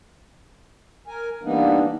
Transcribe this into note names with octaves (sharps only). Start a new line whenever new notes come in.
A#4 G#5
E3 G3 A#3 B3 D4 D#4